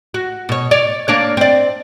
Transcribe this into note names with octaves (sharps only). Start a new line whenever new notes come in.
F#4
B2 C#5
C#5 D5
A#3 D4 C#5
C4 D5